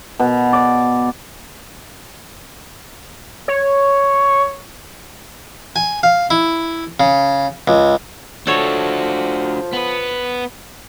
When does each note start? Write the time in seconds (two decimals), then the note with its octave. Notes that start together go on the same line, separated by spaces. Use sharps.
0.19 B2
0.53 D5
3.48 C#5
5.76 G#5
6.03 F5
6.30 E4
7.00 C#3
7.68 C#2
8.47 F3 D4 F#4 A4 C#5
9.73 B3 B4